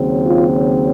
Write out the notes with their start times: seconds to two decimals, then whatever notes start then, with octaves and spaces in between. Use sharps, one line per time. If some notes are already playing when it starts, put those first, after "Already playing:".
Already playing: D#2 C#3 F#3 C4
0.26 F4